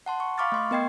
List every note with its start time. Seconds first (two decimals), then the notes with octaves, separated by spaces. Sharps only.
0.06 F#5 A5 C6
0.20 C#6
0.38 F5 B5 C#6 D6 F6 A6
0.52 A3 C6 C#6
0.71 B3 A#4 D#5 G5 G#6 C7